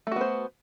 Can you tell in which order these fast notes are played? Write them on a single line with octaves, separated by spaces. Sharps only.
A3 F#4 B3 C5